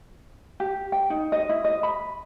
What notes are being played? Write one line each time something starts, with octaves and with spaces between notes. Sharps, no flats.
G4
G5
D#4
D#5
E4
D#5
B5